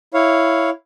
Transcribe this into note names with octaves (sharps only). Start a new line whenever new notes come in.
E4 C#5 F5